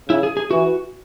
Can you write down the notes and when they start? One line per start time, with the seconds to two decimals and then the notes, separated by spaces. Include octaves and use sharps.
0.09 C#3 E4
0.23 G#4
0.37 G#4
0.51 E3 F#4